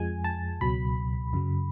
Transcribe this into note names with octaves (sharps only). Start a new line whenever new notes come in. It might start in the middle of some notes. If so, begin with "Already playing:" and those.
Already playing: F2 F3 G#3 G#5
A5
C#2 B2 F#3 B5
F#2 C#3 F#3